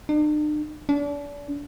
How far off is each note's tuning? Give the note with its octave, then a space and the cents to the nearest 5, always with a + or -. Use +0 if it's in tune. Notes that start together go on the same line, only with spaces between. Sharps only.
D4 +45
D4 -35